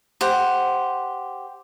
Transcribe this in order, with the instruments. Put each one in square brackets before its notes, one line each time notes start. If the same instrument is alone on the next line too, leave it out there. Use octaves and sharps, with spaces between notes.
[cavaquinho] G4 C5 F#5